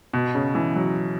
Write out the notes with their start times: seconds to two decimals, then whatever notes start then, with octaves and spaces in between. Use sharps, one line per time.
0.13 B2
0.35 C#3
0.55 E3
0.76 F#3